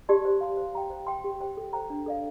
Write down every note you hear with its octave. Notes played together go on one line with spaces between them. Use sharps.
G4 D5 A5 C6
C5
F5 C6
C5
G5 A#5
C5
G5 C6
G4
C5 G5
A4
C5 G5 A#5
D4
A4 D5 F5